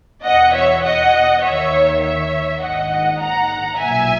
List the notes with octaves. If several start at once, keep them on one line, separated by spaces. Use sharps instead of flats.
E2 B2 D#5 F#5
C#5 E5
D#5 F#5
D#2 D#3 C#5 E5
C#5 E5
A#1 G#2 D#3 D#5 F#5
F#5 A#5
B1 A#2 E5 G#5